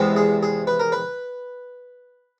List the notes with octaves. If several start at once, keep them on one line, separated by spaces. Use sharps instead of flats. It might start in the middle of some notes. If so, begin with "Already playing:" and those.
Already playing: E2 C3 E3 G#3 B3
G#4
G#4
B4
A#4
B4